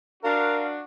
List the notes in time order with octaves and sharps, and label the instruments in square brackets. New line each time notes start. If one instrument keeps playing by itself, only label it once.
[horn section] D4 F#4 [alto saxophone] A#4 [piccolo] F5